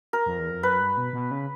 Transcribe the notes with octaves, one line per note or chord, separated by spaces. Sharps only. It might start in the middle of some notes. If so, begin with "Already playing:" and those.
A#4
F2
E2
F2
F#2 B4
G2
B2
B2
C#3